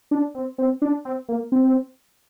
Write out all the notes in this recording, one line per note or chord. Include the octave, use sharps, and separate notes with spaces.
D4
C4
C4
D4
C4
A#3
C4